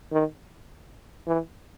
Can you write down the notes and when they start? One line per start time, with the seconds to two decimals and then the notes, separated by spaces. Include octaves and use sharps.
0.13 D#3
1.27 E3